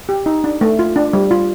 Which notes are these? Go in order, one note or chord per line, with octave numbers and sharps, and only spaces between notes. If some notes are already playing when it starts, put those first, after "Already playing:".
G4
D#4
D4
A3
F4
D4
G3
F4